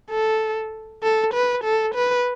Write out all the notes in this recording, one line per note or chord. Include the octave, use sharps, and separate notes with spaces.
A4
A4
B4
A4
B4